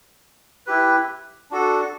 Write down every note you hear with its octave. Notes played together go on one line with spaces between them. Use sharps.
E4 G4 B4
D4 F#4 A4